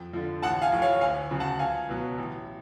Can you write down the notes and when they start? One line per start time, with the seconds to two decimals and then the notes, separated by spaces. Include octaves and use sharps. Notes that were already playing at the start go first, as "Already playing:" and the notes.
Already playing: F2
0.13 D3 F3
0.42 A1 F#5 A5
0.62 F5 G#5
0.72 A2 F3
0.82 C#5 F5
1.01 D2 F5 G#5
1.31 C#3 F#3
1.40 F#5 A5
1.59 C#2 F5 G#5
1.89 B2 F#3
2.18 A1